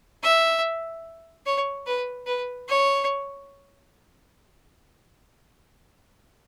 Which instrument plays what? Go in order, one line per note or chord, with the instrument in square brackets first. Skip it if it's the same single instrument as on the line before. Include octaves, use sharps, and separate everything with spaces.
[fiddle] E5
C#5
B4
B4
C#5